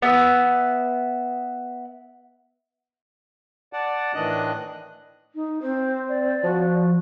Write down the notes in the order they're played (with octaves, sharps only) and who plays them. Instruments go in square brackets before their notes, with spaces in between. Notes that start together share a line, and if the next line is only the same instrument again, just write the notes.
[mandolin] B3 E5
[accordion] D5 F#5 A5
A2 D#3 E3 D4 D#5 F#6
[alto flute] D#4
[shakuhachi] C4 [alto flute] C5
[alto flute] D5
[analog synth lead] F3 [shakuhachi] F#4